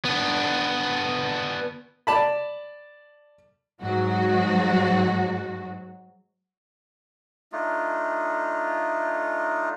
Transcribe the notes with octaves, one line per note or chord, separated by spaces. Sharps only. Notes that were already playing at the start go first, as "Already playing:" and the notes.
B3 D4
D5 A5 B5
G#2 F#3 F#4
A3 D4 D#4 F4